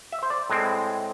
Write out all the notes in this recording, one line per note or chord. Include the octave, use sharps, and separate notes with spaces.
E5
C5
D5
A2 G#3 C4